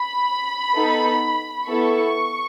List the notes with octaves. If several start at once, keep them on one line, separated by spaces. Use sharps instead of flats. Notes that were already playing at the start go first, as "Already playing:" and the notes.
Already playing: B5
B3 D#4 A4
B3 E4 A4 C#6